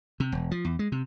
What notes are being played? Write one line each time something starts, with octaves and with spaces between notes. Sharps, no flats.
C3
E1
F3
E2
G#3
C3